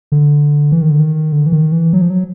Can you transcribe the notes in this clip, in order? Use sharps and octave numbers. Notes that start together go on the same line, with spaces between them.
D3
E3
D#3
D3
D#3
D3
E3
D#3
E3
F#3
F3
F#3